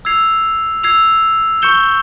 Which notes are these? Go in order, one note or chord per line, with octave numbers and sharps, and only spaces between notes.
E6 G#6 C7 F7
E6 G#6 C7 F7
C#6 G6 C#7 E7 G7